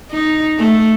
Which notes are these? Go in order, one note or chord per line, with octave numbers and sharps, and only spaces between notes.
D#4
A3